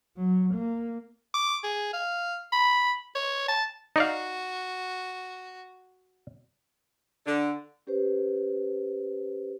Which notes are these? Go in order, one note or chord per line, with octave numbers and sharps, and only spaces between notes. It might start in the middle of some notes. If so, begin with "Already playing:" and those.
F#3
A#3
D6
G#4
F5
B5
C#5
A5
D#4 F#4 D5 F5
D3
C#4 G4 B4 C5